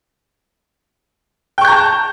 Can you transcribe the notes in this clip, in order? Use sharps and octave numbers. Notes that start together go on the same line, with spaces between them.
G5 A5 A#5 C#6 G6